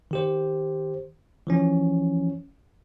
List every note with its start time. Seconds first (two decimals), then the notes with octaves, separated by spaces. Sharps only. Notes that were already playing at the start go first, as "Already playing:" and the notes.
0.11 D#3 G4 C5
1.47 E3 F3 C#4